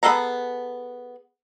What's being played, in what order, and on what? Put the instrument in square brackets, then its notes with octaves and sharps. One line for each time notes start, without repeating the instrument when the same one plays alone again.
[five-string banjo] B3 G#4 A4 F5 A#5